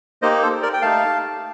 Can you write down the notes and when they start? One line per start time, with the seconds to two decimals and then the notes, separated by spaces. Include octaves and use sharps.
0.22 A#3 D#4 G4 C5 D#5
0.42 A4 C5
0.62 A#4 D5
0.73 G5
0.82 A3 D#4 G4 F5 A5